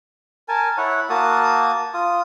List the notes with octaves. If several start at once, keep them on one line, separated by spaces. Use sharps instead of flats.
A#4 G#5 A5
E4 C#5 F#5
A#3 F#4 A5 D#6
F4 D#6